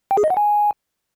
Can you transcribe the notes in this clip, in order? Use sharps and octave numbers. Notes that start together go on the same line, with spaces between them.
G5
G#4
D#5
F#5
G#5